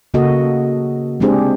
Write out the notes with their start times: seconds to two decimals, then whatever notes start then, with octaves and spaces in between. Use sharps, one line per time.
0.14 C#3 A#3 F#4 A4 D#5
1.20 G#3 C4 D4 G4 G#4 C5